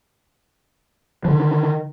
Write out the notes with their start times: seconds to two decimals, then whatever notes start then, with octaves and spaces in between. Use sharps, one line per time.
1.25 F3
1.28 D3
1.31 D#3